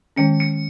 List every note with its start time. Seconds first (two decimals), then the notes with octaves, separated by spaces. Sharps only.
0.16 D#3 G#3 C#4 C#7
0.40 C#7